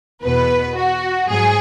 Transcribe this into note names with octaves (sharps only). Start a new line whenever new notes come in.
E2 B2 B3 B4
F#4
G#2 F#3 G#4